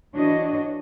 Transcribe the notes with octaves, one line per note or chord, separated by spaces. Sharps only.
E3 D4 F#4 C#5 D#5